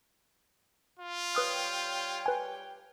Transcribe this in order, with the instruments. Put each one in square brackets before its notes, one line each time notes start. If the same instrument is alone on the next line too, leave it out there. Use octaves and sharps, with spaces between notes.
[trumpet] F4
[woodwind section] G3 C#5 G5 [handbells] B4 D#6 F6
[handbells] B4 G#5